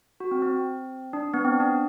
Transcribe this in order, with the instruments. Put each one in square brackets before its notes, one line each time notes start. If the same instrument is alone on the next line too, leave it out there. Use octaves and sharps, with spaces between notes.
[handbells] F#4
C4
C4
D4
B3
C4
D4